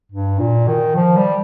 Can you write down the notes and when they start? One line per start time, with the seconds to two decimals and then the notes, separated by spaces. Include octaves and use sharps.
0.12 G2
0.40 A#2
0.68 D#3
0.96 F3
1.17 G3